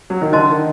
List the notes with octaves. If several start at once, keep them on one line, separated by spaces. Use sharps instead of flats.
F#3
D#3
D3 C5 D#5 A5 C6
D#3